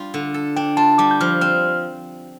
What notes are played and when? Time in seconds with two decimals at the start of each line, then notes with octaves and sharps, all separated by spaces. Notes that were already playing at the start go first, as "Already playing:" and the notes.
Already playing: G3 D4 F4
0.14 D3
0.34 A4
0.56 D4 G5
0.77 F4 A5
0.98 G3 D6
1.11 G6
1.21 F3 F6
1.41 C4 F6